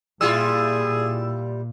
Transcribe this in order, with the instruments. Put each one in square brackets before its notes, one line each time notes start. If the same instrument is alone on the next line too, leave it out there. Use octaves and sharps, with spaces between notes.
[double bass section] A#2 [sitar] G3 E4 F4 [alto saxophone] G#4 [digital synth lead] E6